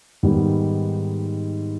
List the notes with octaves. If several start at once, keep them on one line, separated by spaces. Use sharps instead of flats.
G#2 D#3 G3 B3